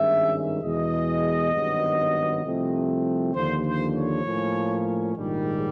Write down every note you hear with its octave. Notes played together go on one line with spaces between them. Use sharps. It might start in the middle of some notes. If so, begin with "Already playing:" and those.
Already playing: G#1 G2 D#3 G#3 C#4 E5
E2 B2 G#3 D#5
G#1 G2 D#3 F#3 B3
C2 C3 F3 A3 C4
D#2 D3 F3 C5
C5
C#5
A2 F3 A#3 C#4
A#1 G#2 D#3 G3